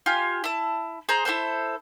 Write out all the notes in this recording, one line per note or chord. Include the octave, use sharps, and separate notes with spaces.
F4 G4 G#5 F6
E4 A5
G#4 C5 A#5
E4 G#4 A4 C5